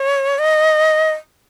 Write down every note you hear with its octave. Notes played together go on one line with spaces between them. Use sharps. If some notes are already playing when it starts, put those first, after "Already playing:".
Already playing: C#5
D#5